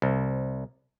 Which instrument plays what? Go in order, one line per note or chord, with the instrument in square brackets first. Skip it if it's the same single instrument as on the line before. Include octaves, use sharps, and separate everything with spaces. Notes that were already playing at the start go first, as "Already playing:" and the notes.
[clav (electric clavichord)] C2